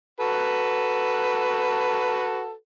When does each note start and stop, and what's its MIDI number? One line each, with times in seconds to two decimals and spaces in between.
0.20 2.52 66
0.20 2.52 69
0.20 2.52 71